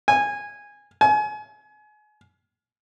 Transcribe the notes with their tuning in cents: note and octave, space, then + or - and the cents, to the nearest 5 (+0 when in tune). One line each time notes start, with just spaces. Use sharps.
G#5 -15
G#5 +30